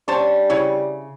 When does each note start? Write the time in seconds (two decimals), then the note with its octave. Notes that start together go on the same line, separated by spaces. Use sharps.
0.08 G3 C#4 D4 C5 C#5 A5
0.50 C#3 E4 C#5